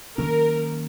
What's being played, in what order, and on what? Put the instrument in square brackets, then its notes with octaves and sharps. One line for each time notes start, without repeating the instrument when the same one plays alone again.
[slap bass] D#3 F#3 A#3 C#4 [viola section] A#4